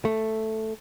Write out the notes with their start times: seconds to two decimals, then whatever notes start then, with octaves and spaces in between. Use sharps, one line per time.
0.05 A3